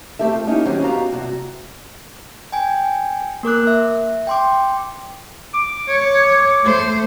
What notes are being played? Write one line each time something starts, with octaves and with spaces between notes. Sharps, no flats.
A3 C4 G4 A4 E5
F4
A#3 C#4 D#4 E4 G4
D#3 F#3 C4 C#4 F#4 G4
B3 F#4 G4 F5 A#5
G2 C3 F#4
G5 G#5
A#3 A#4 D6 F#6
E5
G5 C6 D6
D6
C#5
A3 C5